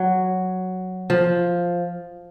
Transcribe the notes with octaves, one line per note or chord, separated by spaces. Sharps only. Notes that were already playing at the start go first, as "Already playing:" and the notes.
Already playing: F#3
F3